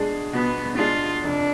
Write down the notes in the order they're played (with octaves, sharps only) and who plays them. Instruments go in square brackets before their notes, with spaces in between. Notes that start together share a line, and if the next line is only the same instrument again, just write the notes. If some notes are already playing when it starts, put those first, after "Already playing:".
Already playing: [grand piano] B2 G#3 D4 G#4
[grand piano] B2 [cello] B3
[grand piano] G#3 D4 G#4 [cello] F4
[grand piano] F1 [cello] D4